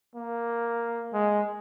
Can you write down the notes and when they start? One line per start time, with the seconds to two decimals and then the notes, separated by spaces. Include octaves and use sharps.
0.16 A#3
1.13 G#3